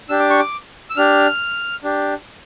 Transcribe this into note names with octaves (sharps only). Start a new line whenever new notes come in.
D4 G4 E6
D6
C#6
D6
E6
D4 G4 F6
D4 G4